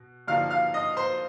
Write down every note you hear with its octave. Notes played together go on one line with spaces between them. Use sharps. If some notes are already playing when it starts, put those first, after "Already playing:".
Already playing: B2
G2 D3 F3 A#3 D#4 F5 F6
F5 F6
D#5 D#6
C5 C6